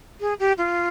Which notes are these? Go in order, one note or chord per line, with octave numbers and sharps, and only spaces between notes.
G#4
G4
F4